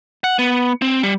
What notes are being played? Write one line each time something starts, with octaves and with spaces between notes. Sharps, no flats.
F#5
B3
C4
G3